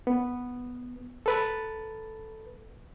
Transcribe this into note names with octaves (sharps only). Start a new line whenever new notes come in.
B3
A4 B4 A6